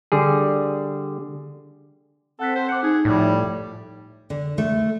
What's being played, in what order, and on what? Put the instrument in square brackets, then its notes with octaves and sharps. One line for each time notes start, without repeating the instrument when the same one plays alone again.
[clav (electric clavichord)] D3 G3 G#4
[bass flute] C4 [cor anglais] A4 [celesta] F#5 F#6 B6
[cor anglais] C5
[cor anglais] F#5 [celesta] D6 C#7
[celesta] D#4 G#6 [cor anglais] G#4
[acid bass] A2 [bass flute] F3 [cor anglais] G3
[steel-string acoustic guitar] D3
A3